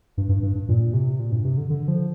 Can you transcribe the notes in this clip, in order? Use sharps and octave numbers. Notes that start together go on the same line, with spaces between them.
G2
G2
G2
G2
A#2
C3
A#2
G2
C3
D3
D3
F3